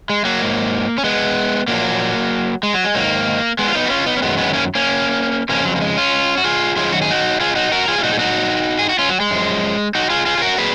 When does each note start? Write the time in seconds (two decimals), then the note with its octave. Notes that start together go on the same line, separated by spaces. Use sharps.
0.10 G#3
0.25 F#3 A#3
0.41 G#2 F#3
0.98 C#4
1.04 G#3 B3
1.68 A#2 F3 F#3 A#3
2.63 G#3
2.74 F#3
2.85 G#3
2.95 G#2 D#3 F#3 A#3
3.59 G#3 B3
3.68 F4
3.75 B3 D#4
3.86 F#4
3.90 C#4 F4
4.06 B3 D#4
4.17 C#4
4.22 F#2 D#3 F#3 G#3 B3
4.38 G#3 B3
4.53 A#3 C#4
4.75 A#3 C#4
5.49 F2 C#3 F3 A#3 C#4
5.65 F#3
5.76 A#3
5.81 G#3
5.97 C#4 F4
6.37 F#4
6.44 F4 G#4
6.76 F#2 D#3 F#3 F4 G#4
6.92 F#4
7.02 G#4
7.11 D#4 F#4
7.40 F4 G#4
7.56 D#4 F#4
7.71 F#4 A#4
7.88 F4 G#4
7.98 F4
8.03 A#2 F#3 D#4 F#4
8.13 G#4
8.19 D#4 F#4
8.79 G#4
8.89 F#4
8.99 C#4 F4
9.09 F#3
9.20 G#3
9.31 F#2 F3
9.95 D#4 F#4
10.10 F4 G#4
10.26 F4 G#4
10.37 G#4
10.42 F#4 A#4
10.58 A#2 F#3 G#4 B4